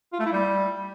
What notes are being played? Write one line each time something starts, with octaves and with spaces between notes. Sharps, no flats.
F4
A3
E4
G3